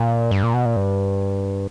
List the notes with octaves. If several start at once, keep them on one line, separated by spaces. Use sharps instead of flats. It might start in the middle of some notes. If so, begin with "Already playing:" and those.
Already playing: A#2
G2
A#2
B2
A#2
G2